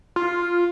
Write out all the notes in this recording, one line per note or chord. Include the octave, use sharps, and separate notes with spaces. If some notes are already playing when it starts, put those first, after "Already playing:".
F4